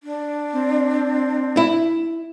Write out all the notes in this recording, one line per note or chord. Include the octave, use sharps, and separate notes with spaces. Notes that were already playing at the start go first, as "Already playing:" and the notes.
D4
C4
E4